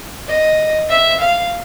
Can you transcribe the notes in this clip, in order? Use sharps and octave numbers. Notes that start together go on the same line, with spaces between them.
D#5
E5
F5